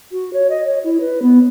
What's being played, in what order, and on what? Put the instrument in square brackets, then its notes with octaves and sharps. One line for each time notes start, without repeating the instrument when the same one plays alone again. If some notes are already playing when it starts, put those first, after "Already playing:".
[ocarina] F#4
C#5
D#5
C#5
E4
B4
B3